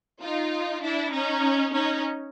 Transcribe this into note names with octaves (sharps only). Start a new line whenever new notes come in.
D#4 F4
D4 E4
C#4 D#4
C#4 D#4